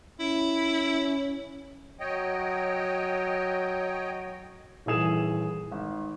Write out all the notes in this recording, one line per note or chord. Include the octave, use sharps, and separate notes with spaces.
C#4 E4
F#3 C#5 D#5 G5
D#1 E3 G#4 E7
G#1